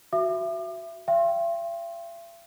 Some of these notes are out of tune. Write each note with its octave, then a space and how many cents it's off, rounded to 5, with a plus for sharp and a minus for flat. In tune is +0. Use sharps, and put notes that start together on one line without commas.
F#4 +0 E5 +25 D6 +40
E5 +45 G5 -10 C6 +35